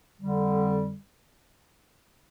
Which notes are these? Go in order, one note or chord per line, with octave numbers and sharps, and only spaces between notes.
F2 D3 G3